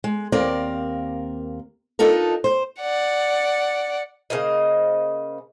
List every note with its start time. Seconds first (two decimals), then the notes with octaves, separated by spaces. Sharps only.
0.04 G#3
0.32 D#2 A#3 C4 A#4 D5
1.99 D4 D#4 F4 A4 A#4
2.44 C5
2.80 D5 F#5
4.30 C#3 A#3 C5 D#5